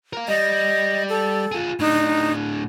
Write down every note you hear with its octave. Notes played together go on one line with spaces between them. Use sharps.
A#4 F5
G3 D#5
A4
F4 G#4
A2 D4 D#4